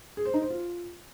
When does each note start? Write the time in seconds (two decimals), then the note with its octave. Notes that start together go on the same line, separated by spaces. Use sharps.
0.17 G#4
0.25 C5
0.34 D#4
0.42 C5
0.50 F4